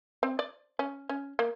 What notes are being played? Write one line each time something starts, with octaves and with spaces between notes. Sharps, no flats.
C4
D5
C#4
C#4
A#3